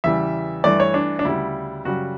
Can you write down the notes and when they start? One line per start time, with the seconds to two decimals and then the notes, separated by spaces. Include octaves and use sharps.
0.04 E2 C#3 E3 G3 E5
0.64 G2 E3 A3 D5
0.80 C#5
0.94 D4
1.19 D4
1.25 D2 C#3 G3 E4
1.85 F#2 C#3 G3 F#4